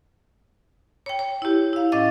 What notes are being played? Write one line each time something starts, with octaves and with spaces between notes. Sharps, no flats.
C#5 G5
C#5
E4 G4
E4 F5
A2 C#4 D#5 F5 D6 A6